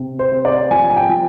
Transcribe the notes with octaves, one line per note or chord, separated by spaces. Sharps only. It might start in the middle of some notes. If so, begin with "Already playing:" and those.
Already playing: C3
C5
C3
D5
F3 G#5
G#5
G5
F3